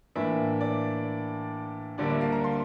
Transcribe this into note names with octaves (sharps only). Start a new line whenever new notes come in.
A2 E3 A#3 D4 E5
D5
D2 D3 G3 A#3 D4 D5
E5
F5
A#5
C6